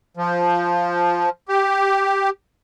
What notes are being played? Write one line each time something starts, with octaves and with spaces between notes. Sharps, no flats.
F3
G4